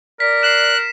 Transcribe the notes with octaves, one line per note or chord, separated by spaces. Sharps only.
A#4 D5 B6
F#6 C7 E7